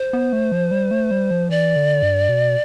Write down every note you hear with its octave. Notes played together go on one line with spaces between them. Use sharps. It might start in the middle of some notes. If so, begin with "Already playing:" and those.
Already playing: C5
B3
A3
F3
G3
A3
G3
F3
E3 D5
D3
G2
B2